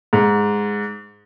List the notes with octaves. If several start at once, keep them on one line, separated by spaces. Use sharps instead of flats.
G#2